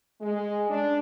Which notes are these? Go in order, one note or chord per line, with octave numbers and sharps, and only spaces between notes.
G#3
D4